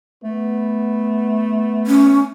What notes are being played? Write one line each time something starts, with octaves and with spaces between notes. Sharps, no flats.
A3 B3
C#4